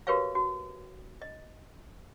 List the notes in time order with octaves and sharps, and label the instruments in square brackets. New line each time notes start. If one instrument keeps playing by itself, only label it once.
[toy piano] F#4 G4 A#4 B4 C#5 F5
F#4
D#5